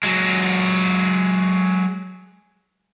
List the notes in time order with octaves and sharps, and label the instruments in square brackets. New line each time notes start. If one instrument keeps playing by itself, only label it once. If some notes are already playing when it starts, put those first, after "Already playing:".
[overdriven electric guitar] F#3 G#3